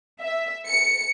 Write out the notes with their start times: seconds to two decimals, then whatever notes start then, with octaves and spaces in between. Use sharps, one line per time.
0.21 E5
0.66 C#7